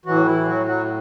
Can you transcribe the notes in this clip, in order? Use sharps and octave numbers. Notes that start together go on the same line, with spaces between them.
A2 E3 F#3 F#4
E3 E4
F#3 F#4
F#3 F#4